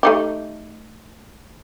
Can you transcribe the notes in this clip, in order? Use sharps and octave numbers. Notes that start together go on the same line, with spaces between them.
A3 D#4 G4